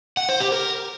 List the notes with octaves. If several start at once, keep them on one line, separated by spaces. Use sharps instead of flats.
F#5
C5
G4
A#4